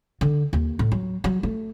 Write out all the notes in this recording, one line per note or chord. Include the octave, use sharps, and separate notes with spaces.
D3
D#2
A2
F#3
F#3
A3